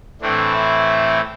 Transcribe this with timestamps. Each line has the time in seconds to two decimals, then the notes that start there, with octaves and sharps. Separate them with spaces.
0.21 A2 E3 A3 C4 D4
0.52 E4